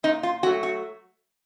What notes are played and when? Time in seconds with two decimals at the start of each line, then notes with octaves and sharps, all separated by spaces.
0.03 A#2 D#4
0.23 F4
0.43 F#3 A3 F#4
0.63 F#4